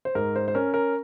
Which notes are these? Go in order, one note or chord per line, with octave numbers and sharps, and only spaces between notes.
C5
G#2 A#4
C5
C5
C#4 A#4
A#4